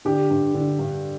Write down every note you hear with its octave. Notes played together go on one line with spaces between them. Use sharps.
D3 G4
G2
D3
G2